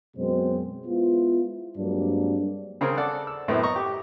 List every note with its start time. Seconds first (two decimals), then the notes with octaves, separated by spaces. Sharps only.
0.17 F#2 B2 G#3 C4 C5
0.87 G#3 B3 E4 F4
1.77 G2 F#3 G#3 A#3 C4 D4
2.81 C#3 C4 G#4 A#4
2.97 A4 D5 F#5
3.27 E6
3.48 F#2 A2 B3 C4 E4
3.63 D#5 A#5 C#6
3.76 G4